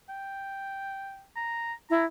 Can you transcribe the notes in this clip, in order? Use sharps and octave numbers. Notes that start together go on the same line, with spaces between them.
G5
A#5
E4 A#5